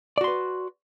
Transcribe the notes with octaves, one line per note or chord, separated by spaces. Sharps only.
F#4 B4 D5 C6